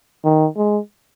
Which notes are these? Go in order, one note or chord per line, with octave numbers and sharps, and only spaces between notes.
D#3
G#3